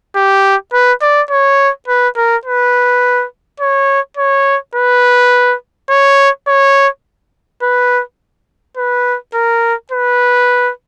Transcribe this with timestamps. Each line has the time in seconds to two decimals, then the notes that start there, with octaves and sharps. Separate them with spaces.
0.16 G4
0.73 B4
1.02 D5
1.31 C#5
1.88 B4
2.17 A#4
2.45 B4
3.60 C#5
4.17 C#5
4.75 B4
5.90 C#5
6.48 C#5
7.62 B4
8.77 B4
9.34 A#4
9.92 B4